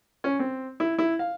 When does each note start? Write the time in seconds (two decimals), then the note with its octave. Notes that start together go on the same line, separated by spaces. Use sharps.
0.24 C#4
0.39 C4
0.80 E4
0.98 E4
1.19 F5